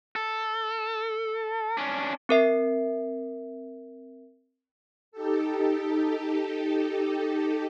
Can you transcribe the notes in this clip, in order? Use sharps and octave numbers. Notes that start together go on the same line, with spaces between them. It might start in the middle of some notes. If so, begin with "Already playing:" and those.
A4
C#4 D4
C4 A#4 E5 C7
D#4 G4 A4